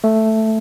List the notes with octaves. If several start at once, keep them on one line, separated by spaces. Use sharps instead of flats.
A3